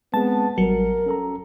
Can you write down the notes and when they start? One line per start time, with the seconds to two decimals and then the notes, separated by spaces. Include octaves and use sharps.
0.14 G#3 B3 C4 G#4 A5
0.58 A1 F#3 G3 A#4 C#7
1.06 C#4 A4 A#5